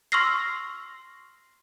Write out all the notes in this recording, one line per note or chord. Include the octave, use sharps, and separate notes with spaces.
C6 C#6 E6 F6 A#6 C7